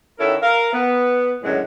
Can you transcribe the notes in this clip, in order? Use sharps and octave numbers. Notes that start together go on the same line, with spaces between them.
D#3 C#4 E4 F#4 A4 A#4
A#4 F5
B3
F#2 A2 D3 D#3 F#3 G#3